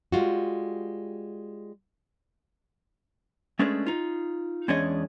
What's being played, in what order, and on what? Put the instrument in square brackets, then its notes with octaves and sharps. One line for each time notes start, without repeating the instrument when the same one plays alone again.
[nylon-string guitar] G3 G#3 F4 F#4
[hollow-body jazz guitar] G#3 A3 C#4 D4 G#4 B4
D#4 F4
E2 G#3 C#4 D4 C#5 D#5